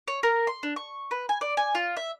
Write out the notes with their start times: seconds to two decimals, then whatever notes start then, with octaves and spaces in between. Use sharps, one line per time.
0.08 C#5
0.23 A#4
0.47 C6
0.63 D4
0.76 C#6
1.11 B4
1.29 G#5
1.41 D5
1.57 G#5
1.75 F4
1.97 E5